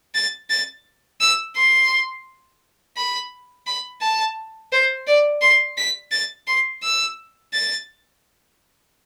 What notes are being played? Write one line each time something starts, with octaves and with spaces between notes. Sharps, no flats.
A6
A6
E6
C6
B5
B5
A5
C5
D5
C6
B6
A6
C6
E6
A6